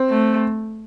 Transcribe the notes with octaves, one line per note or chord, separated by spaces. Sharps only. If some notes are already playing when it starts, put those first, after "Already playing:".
Already playing: C4
A3